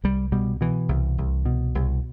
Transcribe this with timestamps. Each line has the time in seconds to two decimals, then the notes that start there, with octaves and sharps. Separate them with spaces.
0.04 C2 G3
0.32 B2 G3
0.61 B2 E3
0.89 C2
1.18 C2
1.46 B2
1.75 C2